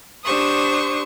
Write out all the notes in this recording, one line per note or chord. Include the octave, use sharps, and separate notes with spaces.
D4 G4 C5 C#6 D#6